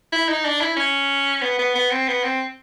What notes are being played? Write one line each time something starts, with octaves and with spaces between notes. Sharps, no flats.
E4
D#4
D4
E4
C#4
B3
B3
B3
C4
B3
C4